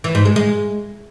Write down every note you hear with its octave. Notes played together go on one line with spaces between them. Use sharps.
E3
G#2
G#3
G#3